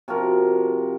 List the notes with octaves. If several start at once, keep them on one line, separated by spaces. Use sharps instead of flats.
C3 F3 F#4 A#4